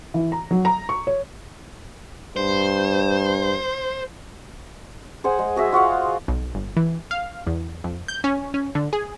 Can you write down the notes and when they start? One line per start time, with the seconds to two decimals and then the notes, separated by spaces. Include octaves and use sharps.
0.14 E3
0.32 A#5
0.51 F#3
0.65 A#5
0.89 C#6
1.07 C#5
2.36 G2 C5
5.24 G#4 C5 F#5 G#5
5.39 G#3
5.56 F#4 G#4 D#5 E5
5.72 F4 F#4 F5 F#5
6.28 B1
6.55 G1
6.77 E3
7.11 F5
7.47 E2
7.84 F2
8.08 G6
8.24 C#4
8.54 C#4
8.75 D3
8.93 G#4